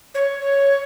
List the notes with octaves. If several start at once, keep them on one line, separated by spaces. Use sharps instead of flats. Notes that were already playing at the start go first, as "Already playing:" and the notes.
C#5